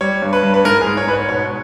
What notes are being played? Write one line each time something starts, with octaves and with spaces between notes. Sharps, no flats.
G3 C#5
G2
B4
G2
B4
G#2 A#4
G#4
G#2
C#5
G#2 B4
C#5
B2 C#5